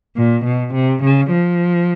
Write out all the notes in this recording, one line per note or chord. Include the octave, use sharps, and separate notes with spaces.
A#2
B2
C3
C#3
F3